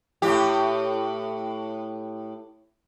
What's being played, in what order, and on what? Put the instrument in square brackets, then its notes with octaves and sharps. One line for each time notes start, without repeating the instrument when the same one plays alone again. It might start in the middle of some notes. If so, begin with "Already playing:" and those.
[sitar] A2 G4